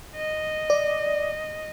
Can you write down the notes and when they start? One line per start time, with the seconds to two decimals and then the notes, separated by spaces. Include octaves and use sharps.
0.16 D#5
0.70 D5